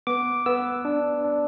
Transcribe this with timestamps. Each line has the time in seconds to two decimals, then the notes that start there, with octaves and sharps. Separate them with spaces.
0.07 B3 D6
0.46 B3 E6
0.85 D4
1.24 D4